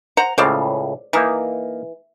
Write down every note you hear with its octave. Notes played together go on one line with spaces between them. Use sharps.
C5 F#5 A#5
C#2 A2 C#3 C5 D5 F5
E3 A#3 D#4 A#4